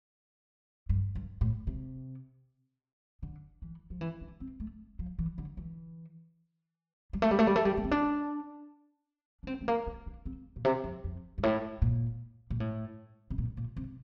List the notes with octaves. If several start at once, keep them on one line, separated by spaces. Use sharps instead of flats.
G2
G2
A2
C3
D3
E3
F3
E3
D4
C4
A3
F3
E3
D3
E3
G3
A3
G3
A3
G3
A3
G3
A#3
C4
D4
D4
C4
A3
A#3
D4
D4
C4
A#2
C3
F2
F2
G2
A2
A#2
A#2
A2
C3
A#2
A#2
C3